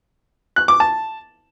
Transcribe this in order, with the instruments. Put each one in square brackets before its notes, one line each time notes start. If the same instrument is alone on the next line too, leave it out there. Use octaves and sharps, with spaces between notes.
[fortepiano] F#6
D6
A5